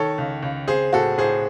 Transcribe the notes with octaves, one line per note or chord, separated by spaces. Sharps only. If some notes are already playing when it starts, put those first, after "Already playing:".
Already playing: D#3 A4 C#5
C#2
C#2
C4 G#4 C5
A2 F#4 A4
A2 G#4 C5